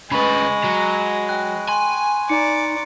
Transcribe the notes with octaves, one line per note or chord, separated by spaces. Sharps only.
C#3 G#3 B4 B5 C#6 F#7
F#3
G5 F#6
G#5 C6
D#4 D5 A#5 C#7